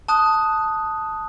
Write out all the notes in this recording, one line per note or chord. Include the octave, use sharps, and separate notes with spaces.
A5 D#6 F#6